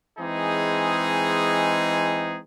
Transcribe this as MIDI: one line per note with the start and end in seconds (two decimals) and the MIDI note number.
0.18 2.39 52
0.18 2.39 56
0.18 2.39 60
0.18 2.39 63
0.18 2.39 68